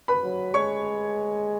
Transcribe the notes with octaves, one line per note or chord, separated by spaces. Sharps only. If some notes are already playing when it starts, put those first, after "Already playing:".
B4 B5
F#3
G#3 C#5 C#6